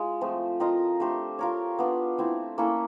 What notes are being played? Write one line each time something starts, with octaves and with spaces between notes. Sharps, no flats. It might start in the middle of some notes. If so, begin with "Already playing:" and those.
Already playing: G#3 F4
F3 A3 C4
C4 F4 A#4 D#5
A3 D4 G4 C5
C4 F4 A#4 C#5
B3 D4 F4
A3 C4 E4
A#3 C#4 E4 A4